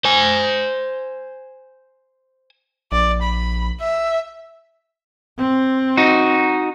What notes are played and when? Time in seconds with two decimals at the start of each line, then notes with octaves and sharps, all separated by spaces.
0.05 C5 G#5
2.92 A#1 D5
3.22 B5
3.81 E5
5.38 C4
5.97 D#4 F#4